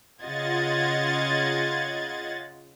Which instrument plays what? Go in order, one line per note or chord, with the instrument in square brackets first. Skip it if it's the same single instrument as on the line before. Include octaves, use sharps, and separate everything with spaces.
[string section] C#3 F4 D#5 F#5 G#6 A6